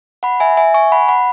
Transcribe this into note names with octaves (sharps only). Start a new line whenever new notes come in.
F#5 B5
E5 G#5
E5 G#5
G#5 C#6
F#5 B5
F#5 B5